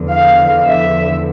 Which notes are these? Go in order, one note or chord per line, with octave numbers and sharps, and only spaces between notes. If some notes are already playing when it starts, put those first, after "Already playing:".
Already playing: E2 D3 F3
F5
E5